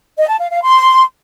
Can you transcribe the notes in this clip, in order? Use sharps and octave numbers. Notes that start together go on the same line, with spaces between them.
D#5
A5
F5
F5
C6